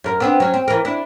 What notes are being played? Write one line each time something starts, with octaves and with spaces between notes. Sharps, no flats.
F#2 A#4
B3 C4 D4
F#3 C#4
C4
E3 A#4
D4 E4